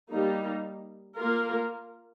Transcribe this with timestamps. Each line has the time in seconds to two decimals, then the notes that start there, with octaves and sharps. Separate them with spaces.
0.11 G3 A#3 D#4
1.17 A#3 F4 A#4